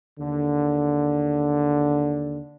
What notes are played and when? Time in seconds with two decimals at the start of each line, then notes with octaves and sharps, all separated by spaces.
0.20 D#2 D3